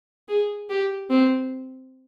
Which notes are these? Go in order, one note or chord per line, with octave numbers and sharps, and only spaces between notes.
G#4
G4
C4